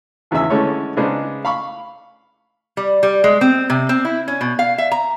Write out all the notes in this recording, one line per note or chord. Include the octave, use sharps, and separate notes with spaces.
G#1 E2 C#3 E3 E5 E6
D3 E3 G#3 A3 C#4 C#5
C#3 G#3 B3 D4 D#4 C5
F5 B5 C#6
G3
G3
G#3
C4
C3
C4
E4
C#4
B2
F5
E5
A#5